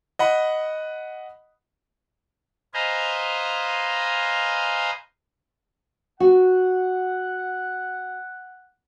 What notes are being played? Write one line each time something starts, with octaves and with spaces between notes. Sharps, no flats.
D#5 F#5 B5
B4 C5 D#5 F5 G#5 A#5
F#4 F#5